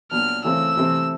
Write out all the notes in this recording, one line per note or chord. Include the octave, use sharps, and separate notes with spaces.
A#2 F#3 B3 D4 F6
C#3 E3 A3 C4 E6
C3 E3 A3 C4